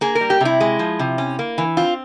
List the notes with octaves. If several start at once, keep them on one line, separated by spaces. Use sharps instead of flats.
A#3 G#4
A#4
G3
G4
C3 E4
G#3
F3
C3
C#4
A#3
E3
C4 F4